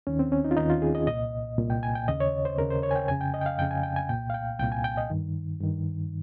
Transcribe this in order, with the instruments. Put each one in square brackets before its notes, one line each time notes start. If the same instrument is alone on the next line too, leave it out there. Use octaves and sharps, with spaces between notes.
[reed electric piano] D#2 D#3 C#4
C4
C#4
D#4
F4
D#2 D#3 D#4
F4
G#4
D#5
C2 A#2 D#5
C2 A#2
G5
G#5
G5
D#2 C#3 D#5
C#5
C5
D#2 C#3 A#4
C5
C#5
G#5
G5
F2 C#3 G#5
G5
D#5
G5
F5
F2 C#3 G5
G#5
G5
G#5
C2 A#2 G5
F5
G5
C2 A#2 G5
G#5
G5
D#5
G2 D#3
G2 D#3